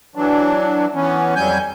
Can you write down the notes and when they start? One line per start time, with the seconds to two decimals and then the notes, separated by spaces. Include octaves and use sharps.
0.15 E3 F#3 D4
0.94 E3 B3 C#4
1.36 F2 F#3 G3 G#5 G6